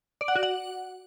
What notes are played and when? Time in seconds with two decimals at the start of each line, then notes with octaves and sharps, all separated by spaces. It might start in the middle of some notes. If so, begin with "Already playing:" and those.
0.21 D5
0.28 F#5
0.36 F#4
0.43 F#5